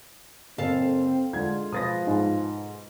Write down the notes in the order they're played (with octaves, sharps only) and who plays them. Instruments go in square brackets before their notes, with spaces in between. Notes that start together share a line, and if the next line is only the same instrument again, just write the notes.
[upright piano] F#1 [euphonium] C4 [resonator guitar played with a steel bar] A4 F5
[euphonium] D3 [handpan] G#3 F4 [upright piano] G#6
[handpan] B2 B4 [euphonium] F3 [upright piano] D#6 A6 A#6
[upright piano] G#2